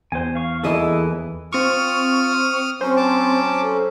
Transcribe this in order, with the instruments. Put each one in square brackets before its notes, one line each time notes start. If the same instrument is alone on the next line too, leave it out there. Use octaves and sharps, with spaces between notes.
[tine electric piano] E2 [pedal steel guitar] C5 G#5
[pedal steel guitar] F5 C#6
[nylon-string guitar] D#2 E3 D#5 [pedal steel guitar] E4 G#4 A4
[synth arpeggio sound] C4 C#6 [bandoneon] F4 [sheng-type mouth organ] D#6 F6
[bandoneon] F#3 C#4 [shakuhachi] C4 [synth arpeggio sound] C5
[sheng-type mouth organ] A5 D6
[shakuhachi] A4